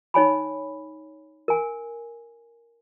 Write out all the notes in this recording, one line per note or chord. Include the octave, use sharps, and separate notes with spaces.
D#4 C#5 G#5 B5
A#4 G#5